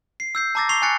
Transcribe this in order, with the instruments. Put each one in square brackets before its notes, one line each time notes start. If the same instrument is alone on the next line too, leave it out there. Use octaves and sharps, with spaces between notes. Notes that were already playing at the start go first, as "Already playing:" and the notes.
[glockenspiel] C7
E6 G6 C7
A5 A#5 D6 E6 A6 A#6
C#6 D6 C7 F7 G7
G#5 C#6 F#6 A6 C#7